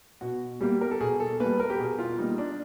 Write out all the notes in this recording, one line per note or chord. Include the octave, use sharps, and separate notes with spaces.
B2 F#4
G3 A#3 G4
A#4
A4
B2 G#4
A4
G3 A#3 B4
A#4
G4
B2 G#4
F4
G3 A#3 D#4
D4